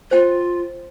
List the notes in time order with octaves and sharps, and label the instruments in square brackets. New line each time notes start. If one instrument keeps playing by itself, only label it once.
[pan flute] F4 [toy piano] C5 G5